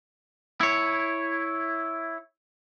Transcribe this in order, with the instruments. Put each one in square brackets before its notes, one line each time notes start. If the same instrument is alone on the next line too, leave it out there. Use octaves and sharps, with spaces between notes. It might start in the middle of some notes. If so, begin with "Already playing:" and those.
[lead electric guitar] E4 C#5